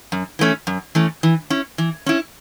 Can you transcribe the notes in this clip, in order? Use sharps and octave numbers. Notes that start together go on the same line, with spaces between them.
F#2
E3 A3 C#4
F#2
E3 A3 C#4
E3
C#4 E4
E3
C#4 E4